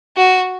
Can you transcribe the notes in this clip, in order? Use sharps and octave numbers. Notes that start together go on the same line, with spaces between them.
F#4